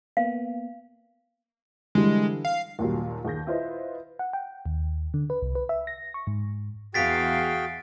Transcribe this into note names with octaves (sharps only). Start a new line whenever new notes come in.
A#3 B3 F5
D3 E3 G3 G#3
F5
D#2 A#2 F#3 G3
D#2 G#4 G6 A#6
E4 F4 B4 C5 D#5 E5
F#5
G5
D#2
D3
B4
C2
B4
E5
A#6
C#6
G#2
E2 F#4 G#4 F5 G5 A6 B6 D7